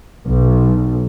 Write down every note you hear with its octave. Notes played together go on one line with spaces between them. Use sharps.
B1